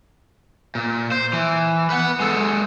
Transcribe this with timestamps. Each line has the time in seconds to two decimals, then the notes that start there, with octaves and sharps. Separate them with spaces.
0.75 A#2
1.12 C5
1.33 E3
1.90 B4 F#5
2.20 G#3 A4